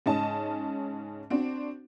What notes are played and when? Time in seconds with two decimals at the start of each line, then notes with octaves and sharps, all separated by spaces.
0.06 G#2 C#3 C#4 D#5 A5
1.30 C4 D4 F#4